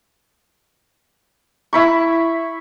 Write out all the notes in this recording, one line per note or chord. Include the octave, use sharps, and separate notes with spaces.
E4 B5 C#6